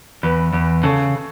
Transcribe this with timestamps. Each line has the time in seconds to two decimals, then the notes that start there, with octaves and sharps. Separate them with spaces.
0.23 E2 B4
0.53 E2
0.83 C#3 A4